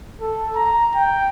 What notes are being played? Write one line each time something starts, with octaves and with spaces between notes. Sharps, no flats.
A4
A#5
G5